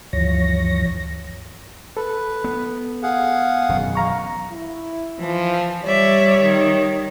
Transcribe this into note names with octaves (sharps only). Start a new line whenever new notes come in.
D2 G2 E3 F3 C#5 A#6
A4 B4
B3
G#4 F5 F#5
E1 F#2 D#3
F5 A#5 C#6
E4
E3 F3
G3 C#5 D5 E5
D#3